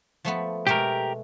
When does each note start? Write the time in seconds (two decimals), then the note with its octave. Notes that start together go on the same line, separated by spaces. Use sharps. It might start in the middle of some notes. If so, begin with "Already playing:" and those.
0.25 F3 A3 B3
0.67 B2 G#3 A3 G4 A#4